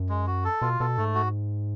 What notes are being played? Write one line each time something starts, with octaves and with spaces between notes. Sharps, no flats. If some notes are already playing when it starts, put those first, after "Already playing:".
Already playing: F#2
G#3
F#4
A4
B2 F4
B2 A4
G#2 A3
F#4